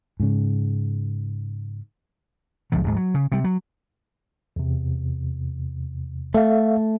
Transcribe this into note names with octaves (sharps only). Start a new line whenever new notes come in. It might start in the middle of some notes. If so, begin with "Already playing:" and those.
G#2 C#3
D#1 C#2 F3 F#3
D1 G#2
F#3
C#3
C3 G3
F#3
E2 C3
A3 A4 E5 F5